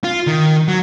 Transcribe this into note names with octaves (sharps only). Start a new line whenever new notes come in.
F4
D#3
F#3